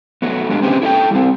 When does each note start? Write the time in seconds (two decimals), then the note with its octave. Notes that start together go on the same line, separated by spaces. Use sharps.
0.22 F#3 A3 B3
0.50 G#3 D4 G4
0.62 C4 C#4 G4 G#4 B4 C5
0.82 E4 A4 D#5 G5
1.11 G3 C4